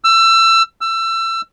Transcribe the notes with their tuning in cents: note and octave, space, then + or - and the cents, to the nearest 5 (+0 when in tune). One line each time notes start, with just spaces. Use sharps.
E6 +25
E6 +25